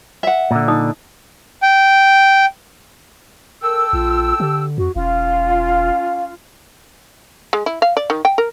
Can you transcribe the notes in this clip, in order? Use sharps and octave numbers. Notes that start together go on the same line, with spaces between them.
E5 F#5
A#2 D3
D#4 D#5 D#6
G5
A4 A#4 G5 E6
A#1 F4
D3 G4
F2 F#4
E1 C#4 F4 F5
G#3
E4
F5
D5
D#3
G5
A#4